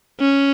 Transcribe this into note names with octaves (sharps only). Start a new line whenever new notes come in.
C#4